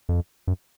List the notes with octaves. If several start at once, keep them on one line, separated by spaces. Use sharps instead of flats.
F2
F#2